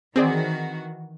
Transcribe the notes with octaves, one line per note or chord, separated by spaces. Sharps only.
D#3 E3 C4 F#4 G#4 D5